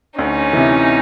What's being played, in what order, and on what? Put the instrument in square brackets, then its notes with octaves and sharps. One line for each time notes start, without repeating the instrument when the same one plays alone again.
[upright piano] D2 [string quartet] C#4 D#4
[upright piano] C3 E3